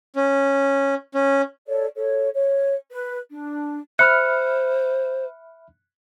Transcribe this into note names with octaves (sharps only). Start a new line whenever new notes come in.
C#4
C#4
A4 C#5 D5
A4 C#5
C#5
B4
D4
C5 E5 B5 F6 F#6 C#7